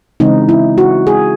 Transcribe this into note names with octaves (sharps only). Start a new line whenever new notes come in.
C#3 E3 G#3 C4 D#4
E4
F#4
G#4